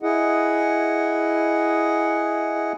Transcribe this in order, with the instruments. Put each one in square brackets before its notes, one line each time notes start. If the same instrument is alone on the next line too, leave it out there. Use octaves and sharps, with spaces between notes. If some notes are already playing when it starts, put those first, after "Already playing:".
[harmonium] E4 G#4 D#5 F#5